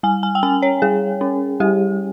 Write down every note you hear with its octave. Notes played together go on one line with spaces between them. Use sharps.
G3 G#5
G#5
G5
C#4 G#5
C#5
G3 G#4
C#4
G3 G4